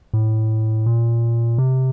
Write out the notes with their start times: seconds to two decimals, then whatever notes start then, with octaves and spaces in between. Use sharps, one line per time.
0.14 A2
0.86 A#2
1.58 C3